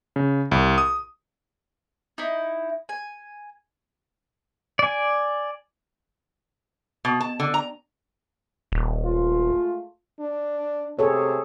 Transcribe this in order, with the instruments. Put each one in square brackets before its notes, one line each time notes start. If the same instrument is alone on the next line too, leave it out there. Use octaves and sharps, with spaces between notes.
[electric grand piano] C#3
C2
D#6
[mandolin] D#4 E4
G#5
[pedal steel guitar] D5 G#5
[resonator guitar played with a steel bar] B2
A5
D3
A#5
[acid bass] D#1
[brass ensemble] G#3 A3 F4
[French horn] D4
[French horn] C3 [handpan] G#4 A4 C#5